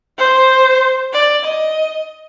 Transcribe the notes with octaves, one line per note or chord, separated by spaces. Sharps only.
C5
D5
D#5